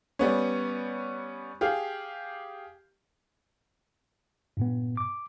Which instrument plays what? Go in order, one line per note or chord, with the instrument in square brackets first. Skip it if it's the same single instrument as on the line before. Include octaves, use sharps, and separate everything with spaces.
[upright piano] G3 B3 C#4
G4 G#4 F5
[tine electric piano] G2 A#2 B3
D6